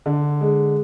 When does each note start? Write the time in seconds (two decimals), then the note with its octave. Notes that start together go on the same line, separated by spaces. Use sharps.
0.06 D3
0.41 G#3